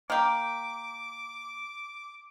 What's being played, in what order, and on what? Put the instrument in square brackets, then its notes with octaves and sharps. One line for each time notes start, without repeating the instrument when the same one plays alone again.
[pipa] A#3 G4 [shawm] D6